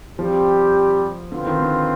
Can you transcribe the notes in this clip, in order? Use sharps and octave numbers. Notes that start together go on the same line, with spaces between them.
F3 G3 C4 G4
D3 C4 F4 B4
D#3
D3